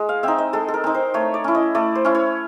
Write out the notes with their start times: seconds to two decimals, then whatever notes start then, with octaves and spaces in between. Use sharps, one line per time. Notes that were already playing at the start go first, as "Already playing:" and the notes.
Already playing: G#3
0.09 F5
0.23 C4 D#4 E5
0.38 D#5
0.53 G#3 A4
0.68 A4
0.74 A#4
0.84 C4 D#4
0.94 C5
1.14 A3 C#5
1.34 D5
1.44 C#4 E4
1.55 D#5
1.75 A3 D5
1.95 C5
2.05 C#4 E4
2.15 C#5